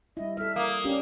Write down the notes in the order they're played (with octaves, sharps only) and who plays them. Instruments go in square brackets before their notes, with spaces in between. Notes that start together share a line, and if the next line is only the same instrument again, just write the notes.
[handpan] G3 E4 [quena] D#5
[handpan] A4 E5 [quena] F6
[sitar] A#3 [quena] D#6
[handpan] C#4 D4 G4